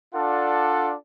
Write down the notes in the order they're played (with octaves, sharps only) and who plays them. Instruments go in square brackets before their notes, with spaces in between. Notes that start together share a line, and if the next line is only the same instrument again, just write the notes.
[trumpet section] D4 F4 A4 D5 F#5